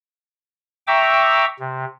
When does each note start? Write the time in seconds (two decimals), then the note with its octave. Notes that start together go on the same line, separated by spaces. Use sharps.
0.87 E5 G5 A#5 C#6 D6 E6
1.60 C3